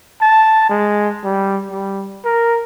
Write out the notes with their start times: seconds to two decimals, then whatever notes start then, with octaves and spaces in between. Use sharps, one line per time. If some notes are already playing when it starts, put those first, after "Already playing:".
0.22 A5
0.70 G#3
1.24 G3
1.70 G3
2.25 A#4